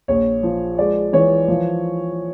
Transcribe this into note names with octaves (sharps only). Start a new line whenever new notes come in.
A#1 C#5
F3
G#3 D5
E3 C#5
F3